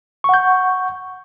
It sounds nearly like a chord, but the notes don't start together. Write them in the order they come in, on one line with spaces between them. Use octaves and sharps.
C#6 F#5 G6